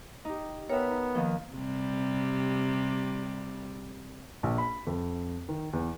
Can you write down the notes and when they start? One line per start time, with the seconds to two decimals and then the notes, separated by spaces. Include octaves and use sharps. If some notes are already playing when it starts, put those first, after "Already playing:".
0.25 D#4 G4
0.70 B3 A#4 C#5 E5 G5
0.90 D#4
1.15 D#2 D#3 F3
1.52 C3 G3
4.43 A#1
4.58 B5
4.87 F2
5.49 D#3
5.73 E2